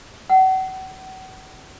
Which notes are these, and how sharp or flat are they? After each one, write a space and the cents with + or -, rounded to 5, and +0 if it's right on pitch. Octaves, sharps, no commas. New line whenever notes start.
F#5 +35